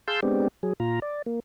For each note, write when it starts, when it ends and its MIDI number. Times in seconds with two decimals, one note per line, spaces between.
0.08 0.20 68
0.08 0.20 77
0.08 0.20 81
0.08 0.20 84
0.08 0.20 88
0.08 0.20 91
0.23 0.48 56
0.23 0.48 59
0.23 0.48 60
0.23 0.48 62
0.23 0.48 67
0.63 0.73 54
0.63 0.73 68
0.80 1.00 46
0.80 1.00 65
0.80 1.00 82
1.02 1.22 74
1.26 1.40 58